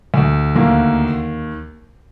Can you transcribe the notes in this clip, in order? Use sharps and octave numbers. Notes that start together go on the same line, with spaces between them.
D2
D#2 A#3